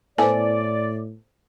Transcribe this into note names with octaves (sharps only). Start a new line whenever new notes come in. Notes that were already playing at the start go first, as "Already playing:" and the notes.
A2 B3 E4 A4 C5 D5 G#5